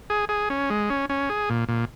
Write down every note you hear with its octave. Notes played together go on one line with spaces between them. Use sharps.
G#4
G#4
C#4
G#3
C#4
C#4
G#4
A#2
A#2